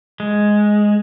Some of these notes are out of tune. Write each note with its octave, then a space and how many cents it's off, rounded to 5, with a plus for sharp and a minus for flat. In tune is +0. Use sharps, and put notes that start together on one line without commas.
G#3 +5